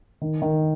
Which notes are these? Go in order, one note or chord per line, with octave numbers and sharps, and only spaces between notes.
D#3
D#3